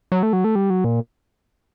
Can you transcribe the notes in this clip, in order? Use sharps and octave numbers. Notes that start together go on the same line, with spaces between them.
F#3
A3
F#3
A3
G3
F#3
A#2